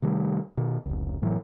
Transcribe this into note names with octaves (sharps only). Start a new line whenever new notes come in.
C3 D#3 G3 A3
B2 D#3
F1 C#2
F#1 A2 E3 F#3